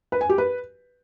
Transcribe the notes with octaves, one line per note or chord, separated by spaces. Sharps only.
B4
G#5
G4
B4